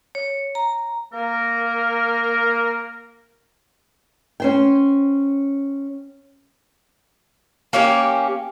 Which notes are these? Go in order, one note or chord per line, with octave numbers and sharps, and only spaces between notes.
C#5
A#5
A#3 A#4
C#4 C5 G5
A#3 C#4 G4